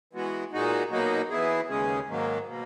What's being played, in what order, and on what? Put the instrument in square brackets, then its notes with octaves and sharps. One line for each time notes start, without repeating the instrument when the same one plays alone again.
[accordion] E3 G#3 B3 F#4
A#2 G#3 D#4 F#4
B2 F#3 A#3 D#4 F#4
E3 B3 E4 G#4
D#2 C#3 G#3 C#4 G#4
G#2 D#3 F#3 A#3
B2 A#3